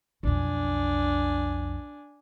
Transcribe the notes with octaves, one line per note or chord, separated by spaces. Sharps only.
B1 F2 D4 G#5